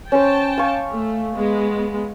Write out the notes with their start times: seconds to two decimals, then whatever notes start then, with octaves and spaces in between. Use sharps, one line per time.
0.12 C#4 C5 G5 A5
0.58 F5 C#6 D6
0.92 A3
1.36 G#3 B3